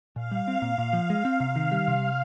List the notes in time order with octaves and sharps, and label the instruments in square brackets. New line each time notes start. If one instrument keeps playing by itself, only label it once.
[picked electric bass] A#2 [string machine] F5
[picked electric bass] G3
C4
A#2
A#2
F3
G#3
C4
C3
D#3
G3
C3